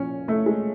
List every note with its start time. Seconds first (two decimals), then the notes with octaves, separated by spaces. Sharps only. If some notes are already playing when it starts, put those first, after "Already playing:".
Already playing: A#2 F3 C#4
0.28 A3
0.46 G#3